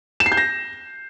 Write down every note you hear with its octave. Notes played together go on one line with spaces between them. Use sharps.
E7
C7
G6
A#6